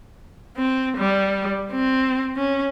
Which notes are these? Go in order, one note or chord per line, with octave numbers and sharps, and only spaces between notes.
C4
G3
C4
C#4